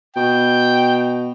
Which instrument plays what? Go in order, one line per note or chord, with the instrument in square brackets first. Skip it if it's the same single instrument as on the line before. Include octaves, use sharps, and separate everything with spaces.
[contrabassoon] B2 [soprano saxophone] G5